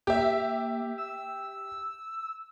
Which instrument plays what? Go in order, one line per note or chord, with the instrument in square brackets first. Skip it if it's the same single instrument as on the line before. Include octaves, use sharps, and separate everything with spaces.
[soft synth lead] A#3 [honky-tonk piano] G4 E5
[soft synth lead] E6